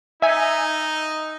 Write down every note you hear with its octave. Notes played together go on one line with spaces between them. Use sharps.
D#4 E5 G#5